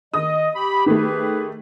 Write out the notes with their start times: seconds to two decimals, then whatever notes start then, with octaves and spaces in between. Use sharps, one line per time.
0.14 D#3 D#5 D#6
0.55 G4 B5
0.86 D#3 A3 G4 G#4 B4